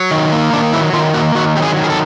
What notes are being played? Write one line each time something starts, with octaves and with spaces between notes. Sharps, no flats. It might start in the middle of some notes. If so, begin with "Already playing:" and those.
Already playing: F#3
D#3
A#3
D#3 D4
F#3 E4
D#3 F4
A#3 F#4
D#3 F#4
F#3 G4
G#4
D#3
G#4
A4